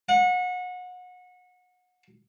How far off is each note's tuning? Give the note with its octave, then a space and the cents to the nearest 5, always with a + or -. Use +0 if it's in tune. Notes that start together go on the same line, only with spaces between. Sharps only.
F#5 -30